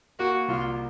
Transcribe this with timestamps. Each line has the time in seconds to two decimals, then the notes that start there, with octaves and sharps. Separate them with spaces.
0.19 A#3 F#4
0.48 C2 F4